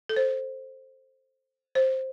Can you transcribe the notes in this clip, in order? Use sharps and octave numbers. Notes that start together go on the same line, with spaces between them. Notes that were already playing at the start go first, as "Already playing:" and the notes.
A4
C5
C5